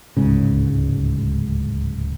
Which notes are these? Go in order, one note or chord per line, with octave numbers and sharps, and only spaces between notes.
D1 C#2 G#2 C#3